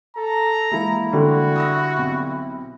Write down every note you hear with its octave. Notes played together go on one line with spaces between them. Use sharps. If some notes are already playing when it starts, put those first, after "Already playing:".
A4 A#5
E3 G#3 A#3 E4
D3 G3 F#4
D#6 E6 A#6
B1 C4